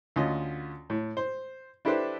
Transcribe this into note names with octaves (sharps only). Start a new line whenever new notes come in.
D2 C#4 F4 D#5
A2
C5
D4 E4 G4 A4 B4 C5